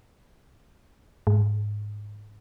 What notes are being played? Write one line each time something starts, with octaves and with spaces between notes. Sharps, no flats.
G#2